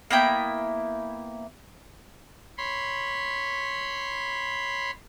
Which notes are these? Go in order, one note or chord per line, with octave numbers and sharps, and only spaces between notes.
A#3 B3 E4 G5
C#5 B5 C6